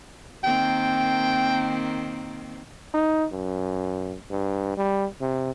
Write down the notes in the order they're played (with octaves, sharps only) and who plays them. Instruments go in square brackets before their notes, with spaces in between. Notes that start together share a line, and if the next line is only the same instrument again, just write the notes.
[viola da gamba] D#3 A#3 C4 [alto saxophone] G5
[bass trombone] D#4
F#2
G2
G3
C3